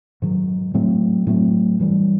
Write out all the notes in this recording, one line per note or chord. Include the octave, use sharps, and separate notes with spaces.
G#2 D#3 F#3
A2 F#3 A3 C4
A2 F#3 A3 C4
G2 E3 G3